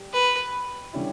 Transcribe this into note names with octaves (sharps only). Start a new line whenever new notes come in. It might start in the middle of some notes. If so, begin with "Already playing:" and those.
Already playing: G3
B4
D3 G3 C#4 E4